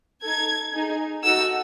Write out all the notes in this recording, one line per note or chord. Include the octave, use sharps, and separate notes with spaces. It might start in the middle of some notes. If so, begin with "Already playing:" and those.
D#4 A4 G#6
D#4 G#4
D#4 F#4 A4 E6